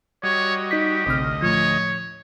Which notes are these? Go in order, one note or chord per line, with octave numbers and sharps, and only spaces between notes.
G3 F#4 C#5 D#5
D#4 G4 B6
A1 D2 C3 D#5 F6
A2 F3 C#5